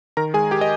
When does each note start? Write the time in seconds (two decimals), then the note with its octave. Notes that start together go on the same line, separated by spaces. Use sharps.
0.17 D#3 A#4 A#5
0.34 G#3 G#4 G#5
0.51 G4 G5
0.61 D#5